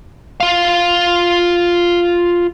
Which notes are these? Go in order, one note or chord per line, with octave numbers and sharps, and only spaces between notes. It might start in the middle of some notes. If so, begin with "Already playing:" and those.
F4 F5